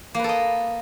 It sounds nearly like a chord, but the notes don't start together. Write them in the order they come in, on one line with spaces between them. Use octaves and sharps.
A#3 B4 A4 D#5